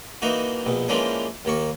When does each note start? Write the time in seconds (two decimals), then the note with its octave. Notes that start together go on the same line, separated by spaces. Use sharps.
0.22 E3 A#3 D#4 F#4
0.66 A#1 B2
0.88 E3 F3 G#3 A#3 C#4 D4
1.45 D#2 A#3 C#6